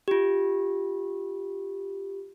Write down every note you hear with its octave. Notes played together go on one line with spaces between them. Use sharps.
F4 G4